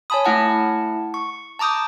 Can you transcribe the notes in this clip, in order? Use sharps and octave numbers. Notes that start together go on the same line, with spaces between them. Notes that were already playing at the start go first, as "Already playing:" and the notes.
C#5 G#5 A5 B5 D#6
A3 E4 F#5 A5
C#6
A5 A#5 D6 D#6 G6